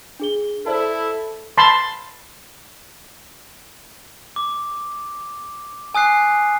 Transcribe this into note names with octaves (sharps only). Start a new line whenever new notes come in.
D4 G#4 G7
E4 A4 C5 D5 A5
A5 B5 C6
D6
G#5 D#6 F#6 C7